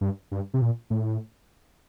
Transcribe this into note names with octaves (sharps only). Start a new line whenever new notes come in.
G2
G2
C3
A#2
A2